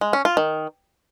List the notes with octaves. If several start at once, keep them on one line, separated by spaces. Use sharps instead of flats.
G#3
C#4
F4
D#3